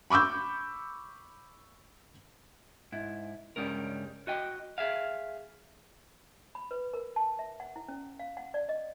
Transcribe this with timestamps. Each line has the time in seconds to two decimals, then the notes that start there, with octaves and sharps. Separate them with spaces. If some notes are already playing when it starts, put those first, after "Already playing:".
0.10 B5 C#6 D6 E6 G6
2.92 G#2 E4
3.56 C#2 G2 G3 G#3 C#4 A#4
4.27 F#4 D#5 G5
4.78 G#4 E5 F5
6.55 B5
6.71 B4
6.94 A#4
7.16 A5
7.39 E5
7.60 F#5
7.76 E4
7.88 C#4
8.20 F5
8.37 F#5
8.54 D5
8.69 D#5